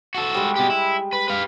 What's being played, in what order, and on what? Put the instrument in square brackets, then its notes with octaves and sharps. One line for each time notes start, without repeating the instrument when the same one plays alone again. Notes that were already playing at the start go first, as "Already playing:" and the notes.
[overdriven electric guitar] F#4 A4
[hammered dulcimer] G3 G#3
[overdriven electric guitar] B2 G4
E4
B4
B4 F5